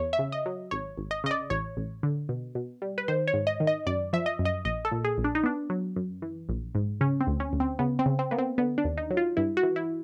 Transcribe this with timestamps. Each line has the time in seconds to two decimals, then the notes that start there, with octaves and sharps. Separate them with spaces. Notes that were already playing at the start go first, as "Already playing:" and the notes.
Already playing: E2 C#5
0.13 E5
0.19 C#3
0.32 D#5
0.46 F#3
0.71 G#1 C#5
0.98 G#1
1.11 D#5
1.24 C#3 D#5
1.31 D5
1.50 A1 C#5
1.77 A1
2.03 D3
2.29 B2
2.55 B2
2.82 G3
2.98 B4
3.08 D#3 C5
3.27 C#5
3.34 G#2
3.47 D#5
3.60 D#3
3.67 D#5
3.86 F#2 D5
4.13 F3 E5
4.26 D#5
4.39 F#2
4.45 D#5
4.65 A#1 D#5
4.85 A4
4.91 A#2
5.05 G#4
5.18 A#1
5.24 D4
5.35 D#4
5.44 B3 D4
5.70 F#3
5.96 F#2
6.22 E3
6.49 A#1
6.75 G#2
7.01 C#3 C#4
7.20 C4
7.27 D2
7.40 C#4
7.53 D2
7.60 C4
7.79 C#3 B3
7.99 C4
8.06 C#3
8.19 C4
8.31 A#3 B3
8.38 C4
8.58 D3 B3
8.78 D4
8.85 D#2
8.97 D#4
9.10 F#3
9.17 F4
9.37 G2 E4
9.57 F#4
9.63 E3
9.76 E4